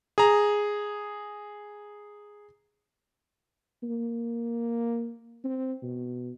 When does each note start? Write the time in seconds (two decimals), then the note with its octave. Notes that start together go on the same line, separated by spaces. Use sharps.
0.18 G#4 A#5
3.83 A#3
5.44 C4
5.82 B2